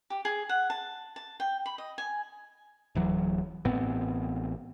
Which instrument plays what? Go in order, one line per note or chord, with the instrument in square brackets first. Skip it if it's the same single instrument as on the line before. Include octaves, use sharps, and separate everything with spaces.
[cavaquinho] G4
G#4
F#5
A5
A5
G5
B5
D#5
G#5
[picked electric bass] D1 E3 F#3
A1 A2 B3 C4